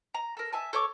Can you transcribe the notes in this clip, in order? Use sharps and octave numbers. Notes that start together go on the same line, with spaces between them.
A#5
A4 A#4
E5 G#5 A5
A4 C#5 C#6 D6